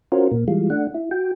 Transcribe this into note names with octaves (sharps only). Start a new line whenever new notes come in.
C#4 F4 F#4 A#4 C5
A#2 A#3
E3 G3 G#3 F4
A3 D4 F#5
E4
F#4 G5